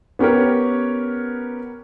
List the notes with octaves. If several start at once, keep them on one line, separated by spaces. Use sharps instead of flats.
B3 C#4 G4 A#4 C#5